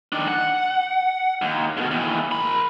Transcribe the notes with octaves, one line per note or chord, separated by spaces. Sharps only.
D#3 D4
F#5
D#2
G#2 B2
D#2 E3
A#4 B5